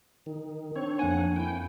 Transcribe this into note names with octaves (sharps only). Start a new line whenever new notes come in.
D#3
C4 D4 C#5
F2 A#3 F#5 G#5
E4 G5